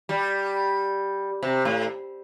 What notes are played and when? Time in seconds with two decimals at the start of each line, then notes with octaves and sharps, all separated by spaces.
0.09 G3
1.43 C3
1.65 A2